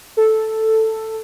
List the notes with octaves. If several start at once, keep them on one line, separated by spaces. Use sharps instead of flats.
A4